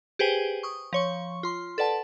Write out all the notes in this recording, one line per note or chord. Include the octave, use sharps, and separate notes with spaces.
G4 G#4 B4 C5 G5 G#5
C#6 D#6
F3 C#5 C#6
F4 C6
A4 B4 D5 F#5 A5